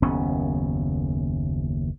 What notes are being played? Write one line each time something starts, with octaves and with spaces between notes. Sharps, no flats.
F#1 D#2 B3 C#4